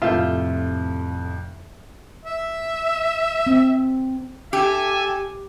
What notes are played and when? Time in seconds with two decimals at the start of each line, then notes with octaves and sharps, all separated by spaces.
0.02 F2 A2 C3 F4 E5 G6
2.26 E5
3.47 C4
4.53 G4 A4 E5 G#5